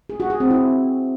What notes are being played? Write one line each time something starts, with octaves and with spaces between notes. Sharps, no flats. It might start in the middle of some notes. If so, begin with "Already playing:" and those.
G#4
F#4
G#4
C4
E4